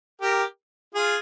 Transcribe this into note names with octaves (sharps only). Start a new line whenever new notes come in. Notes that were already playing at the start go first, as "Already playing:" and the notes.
G4 A#4
F4 G#4